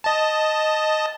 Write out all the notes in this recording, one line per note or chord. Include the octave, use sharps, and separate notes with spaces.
D#5 A5